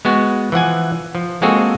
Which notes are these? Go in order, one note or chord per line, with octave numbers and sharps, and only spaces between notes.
G#3 B3 F#4
E3 F3 F#5 G#5
F3
G#3 A#3 C4 F#4 G#4 A4